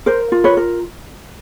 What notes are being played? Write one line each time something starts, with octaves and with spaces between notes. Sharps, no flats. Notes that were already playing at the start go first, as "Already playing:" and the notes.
A#4 C5
F4
B4 C#5
A#4